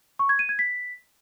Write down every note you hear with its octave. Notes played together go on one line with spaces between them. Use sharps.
C#6
G#6
D#7
G#6
B6